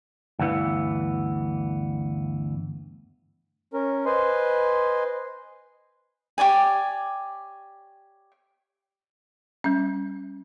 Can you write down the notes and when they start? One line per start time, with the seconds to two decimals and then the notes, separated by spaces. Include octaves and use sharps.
0.39 D2 G2 E3 B3
3.74 C#4 A#4
4.06 B4 C5 D#5 G#5 C6
6.38 G4 C#5 D5 G#5
9.64 G3 C#4